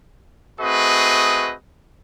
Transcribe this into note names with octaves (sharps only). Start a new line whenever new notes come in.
A3 C4 F#4 G#4 B4 D#5